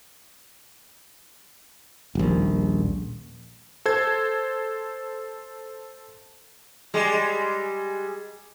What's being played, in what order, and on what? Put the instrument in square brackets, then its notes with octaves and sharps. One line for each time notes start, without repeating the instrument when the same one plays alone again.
[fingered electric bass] D#1 A#1
[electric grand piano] A4 C5 G#6
[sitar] G3 G#3